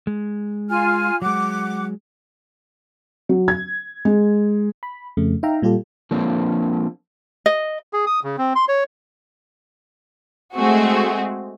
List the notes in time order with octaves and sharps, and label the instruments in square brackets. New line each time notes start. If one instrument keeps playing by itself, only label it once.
[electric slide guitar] G#3
[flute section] F4 G#5 F6
[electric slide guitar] F#3 G#3 [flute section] F#5 D6
[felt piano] F#3
G#6
G#3
[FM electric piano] B5
F2 C#3 A3
D#4 E5 F5 G5 A#5
A#2 G3 F4 G4 A4
[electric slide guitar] F3 A#3 C4 D4
[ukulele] D#5
[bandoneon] G#4
D#6
C#3
C4
C6
C#5
[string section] G#3 A3 C4 F#4 G#4